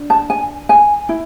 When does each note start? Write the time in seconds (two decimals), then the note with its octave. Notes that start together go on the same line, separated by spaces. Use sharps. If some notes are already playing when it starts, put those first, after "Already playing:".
Already playing: D4
0.10 A5
0.30 G#5
0.69 G#5
1.09 E4